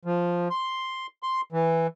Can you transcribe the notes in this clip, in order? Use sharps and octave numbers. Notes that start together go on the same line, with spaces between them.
F3
C6
C6
E3